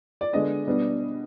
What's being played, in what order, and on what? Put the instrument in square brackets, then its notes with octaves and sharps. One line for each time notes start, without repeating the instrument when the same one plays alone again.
[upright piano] D5
D3 G#3 B3 D4 D#5
B2 G3 B3 D4